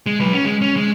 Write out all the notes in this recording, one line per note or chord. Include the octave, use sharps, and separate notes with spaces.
G#3
F#3 B4
C#4
G#3
C#4
G#3